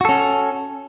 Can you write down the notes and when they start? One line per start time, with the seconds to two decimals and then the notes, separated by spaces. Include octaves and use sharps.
0.01 F#4
0.05 A4
0.09 C#4